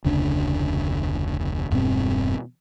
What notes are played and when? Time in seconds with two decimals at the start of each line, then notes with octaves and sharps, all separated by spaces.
0.05 F1 D2 C#3 D4
1.71 E1 G2 B2 C4